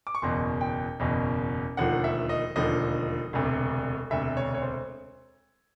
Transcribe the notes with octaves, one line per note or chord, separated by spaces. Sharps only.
D6
C#6
F#1 E2 B2 C6
G5
F#1 E2 B2
E1 D#2 D3 F3 F#5
E5
D#5
E1 D#2 D3 F3 D#5
E1 D2 C3
E1 D2 C3 E5
C#5
C#5
C5